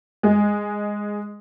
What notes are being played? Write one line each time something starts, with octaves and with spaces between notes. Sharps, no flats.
G#3